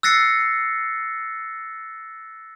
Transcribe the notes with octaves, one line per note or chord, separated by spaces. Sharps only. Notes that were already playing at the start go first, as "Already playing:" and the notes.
E6 F#6 A6 A#6 C7 C#7